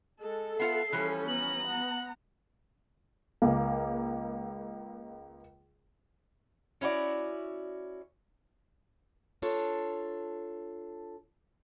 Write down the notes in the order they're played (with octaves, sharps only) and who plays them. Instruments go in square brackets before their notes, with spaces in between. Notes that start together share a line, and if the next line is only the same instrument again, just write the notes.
[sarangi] G#3 [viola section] A4
[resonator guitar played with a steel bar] B3 F4 F#5 [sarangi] E5 [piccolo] C7
[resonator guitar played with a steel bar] E3 F3 G3 [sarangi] C#4
[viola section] B3 A#5 [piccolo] F#7
[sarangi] F#5
[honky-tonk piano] C#2 A#3
[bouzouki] C#4 E4 F#4 D5
[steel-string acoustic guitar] D4 F4 A4 C#5